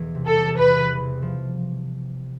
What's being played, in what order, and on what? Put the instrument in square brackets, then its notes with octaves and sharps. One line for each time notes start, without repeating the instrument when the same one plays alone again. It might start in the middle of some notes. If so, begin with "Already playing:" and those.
Already playing: [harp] E1 E2 E3
C3
[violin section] A4
[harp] G3
[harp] E2 [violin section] B4
[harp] E3
C3
F3